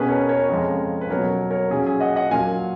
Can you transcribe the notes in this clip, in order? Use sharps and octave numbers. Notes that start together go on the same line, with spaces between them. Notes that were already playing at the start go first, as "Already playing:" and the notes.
Already playing: B2 A#3 C#4 G#4 B4
A#4 C#5
A#4 C#5
F2 C#3 G#3
B4
B2 F#3 A#3 A#4 C#5
A#4 C#5
A#2 F#3 C#4 G#4
G#4
D#5 F#5
D#5 F#5
A#2 F#3 A#3 F5 G#5